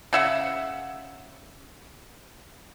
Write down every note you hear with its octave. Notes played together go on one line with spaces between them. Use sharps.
C#3 E5 F#5